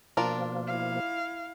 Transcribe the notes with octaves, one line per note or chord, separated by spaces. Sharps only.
B2 F3 A#3 D4 F4 A#4
E4 F5